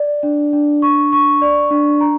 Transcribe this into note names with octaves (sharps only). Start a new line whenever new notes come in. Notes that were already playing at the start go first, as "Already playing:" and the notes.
Already playing: D5
D4
D4
C#6
C#6
D5
D4
A#5